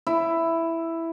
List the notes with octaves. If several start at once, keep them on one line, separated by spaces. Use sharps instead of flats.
E4